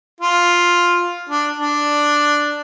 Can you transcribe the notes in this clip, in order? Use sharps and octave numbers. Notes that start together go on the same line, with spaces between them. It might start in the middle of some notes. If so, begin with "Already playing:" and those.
F4
D4
D4